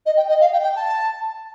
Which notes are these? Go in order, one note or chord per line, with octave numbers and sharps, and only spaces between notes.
D#5
G5
D#5
F5
G5
G5
A5